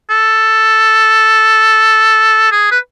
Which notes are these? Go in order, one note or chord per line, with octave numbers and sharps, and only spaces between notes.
A4
G#4
B4